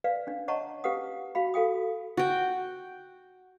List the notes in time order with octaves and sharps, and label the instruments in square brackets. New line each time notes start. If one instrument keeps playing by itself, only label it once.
[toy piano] B4 D5 F5
C#4 D4
C#5 D#5 F#5 A5 A#5 C#6
C#4 G4 B4 F5 F#5 D#6
F#4 F5 B5
F#4 A4 F5 G5 D#6
[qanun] F#4 G5